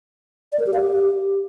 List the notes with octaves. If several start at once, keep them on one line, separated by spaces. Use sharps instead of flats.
D5
A#4
G4
F5
G4